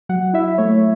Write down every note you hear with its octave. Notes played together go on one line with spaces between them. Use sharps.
F#3 F#5
E4 E5
A3 C#5